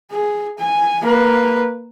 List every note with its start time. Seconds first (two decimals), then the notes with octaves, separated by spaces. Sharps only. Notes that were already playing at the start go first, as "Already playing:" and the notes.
0.12 G#4
0.59 G#5
1.02 A#3 B4